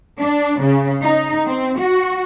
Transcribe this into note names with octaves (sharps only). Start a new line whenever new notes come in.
D4
C#3
D#4
C4
F#4